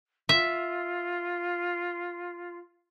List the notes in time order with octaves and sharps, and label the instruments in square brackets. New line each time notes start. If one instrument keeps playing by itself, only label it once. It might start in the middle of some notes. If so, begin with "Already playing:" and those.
[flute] F4 [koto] E5